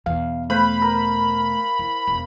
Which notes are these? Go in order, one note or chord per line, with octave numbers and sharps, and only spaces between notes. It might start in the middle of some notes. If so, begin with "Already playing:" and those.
E2 B2 F5
A3 B4 C5 F5 B5
A#4
E4
E1